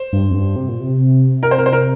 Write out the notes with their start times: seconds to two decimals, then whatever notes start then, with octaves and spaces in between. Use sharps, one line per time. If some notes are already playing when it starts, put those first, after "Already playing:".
Already playing: C5
0.13 G2
0.31 F2
0.34 G2
0.56 C3
0.68 A#2
0.81 C3
1.43 A#4
1.51 C5
1.58 A#4
1.66 C5
1.73 A#4